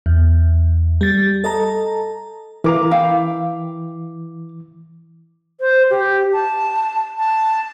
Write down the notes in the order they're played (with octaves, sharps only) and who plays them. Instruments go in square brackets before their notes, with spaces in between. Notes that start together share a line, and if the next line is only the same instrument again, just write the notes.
[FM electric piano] E2
G3 A6
A4 D#5 A5 A#5
[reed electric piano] E3 D6 [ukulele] A#4 F5 A#5
[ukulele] E4 F5 G5
[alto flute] C5
G4
A5
A5